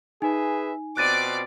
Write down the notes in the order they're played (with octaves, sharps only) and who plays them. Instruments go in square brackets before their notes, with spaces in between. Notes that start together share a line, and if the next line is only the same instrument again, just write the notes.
[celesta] D#4 G#5 [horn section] G#4 B4 E5
[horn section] B2 C4 F4 [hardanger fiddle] D5 D6 [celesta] F#6 A6 D#7